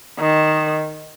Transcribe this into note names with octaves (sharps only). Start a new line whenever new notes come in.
D#3